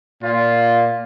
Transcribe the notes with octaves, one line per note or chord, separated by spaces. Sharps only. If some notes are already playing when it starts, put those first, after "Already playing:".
A#2 F4